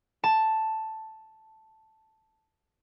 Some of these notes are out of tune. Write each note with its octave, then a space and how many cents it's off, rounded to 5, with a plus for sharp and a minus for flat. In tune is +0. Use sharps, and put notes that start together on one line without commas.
A5 +0